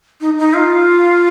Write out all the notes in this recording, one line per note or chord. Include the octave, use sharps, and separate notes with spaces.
D#4
D#4
F4